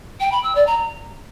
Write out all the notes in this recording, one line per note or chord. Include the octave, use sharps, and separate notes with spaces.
G5
B5
E6
D5
A#5